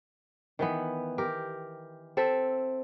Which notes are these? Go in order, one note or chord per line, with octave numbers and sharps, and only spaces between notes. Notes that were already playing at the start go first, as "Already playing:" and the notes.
D#3 E3 B3
G4 A#4
C4 A4 C5 E5